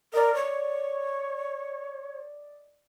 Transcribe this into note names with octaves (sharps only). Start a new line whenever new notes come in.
A#4 D5 D#5
C#5